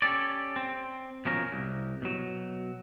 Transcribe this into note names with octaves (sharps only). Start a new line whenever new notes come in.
C#4 G4 A4 D5
C4
B2 F3 C#4 A#4
C2
B2 F#3